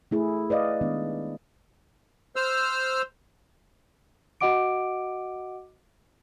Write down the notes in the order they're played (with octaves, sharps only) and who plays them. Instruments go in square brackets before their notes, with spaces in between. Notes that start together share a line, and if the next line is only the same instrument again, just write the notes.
[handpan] A3 E4 G#4
B4 D5 D#5 F5
D#3 G#3 B3 D4
[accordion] C5 E6 F6
[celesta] F#4 D#5 F#5 D6 D7